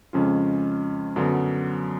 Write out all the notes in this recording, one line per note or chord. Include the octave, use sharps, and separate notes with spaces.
F2 C#3 G#3 C#4 F4
F#2 D3 F#3 B3